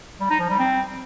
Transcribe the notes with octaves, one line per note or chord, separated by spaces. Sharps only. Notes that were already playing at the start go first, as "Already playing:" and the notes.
G3
D#4
F3
G3
C4